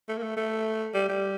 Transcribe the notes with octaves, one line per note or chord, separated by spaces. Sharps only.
A3
A#3
A3
A3
G3
G3